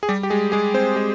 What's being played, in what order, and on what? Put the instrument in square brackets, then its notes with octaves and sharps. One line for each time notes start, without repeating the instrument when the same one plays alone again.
[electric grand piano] G#4
G3 G4
G4
G#3 G#4
G#3 G#4
C4 C5
G#3 G#4